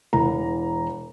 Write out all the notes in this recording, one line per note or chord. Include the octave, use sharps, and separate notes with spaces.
E1 E3 A#5